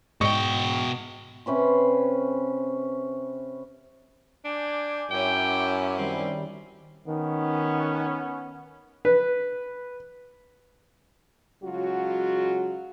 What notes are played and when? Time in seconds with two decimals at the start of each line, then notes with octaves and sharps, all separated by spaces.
0.21 G#2 B2 D#5 G5 C#6 C#7
1.46 C3 C#4 B4 C6
4.45 D4 G#5 D6 G6
5.11 F#2 C#4 E4 G5
5.98 D#3 G3 C4
7.08 D#3 B3 C#4
9.05 B4
11.64 C#3 F#3 G#3 F4 F#4